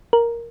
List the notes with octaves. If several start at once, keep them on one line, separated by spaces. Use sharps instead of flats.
A#4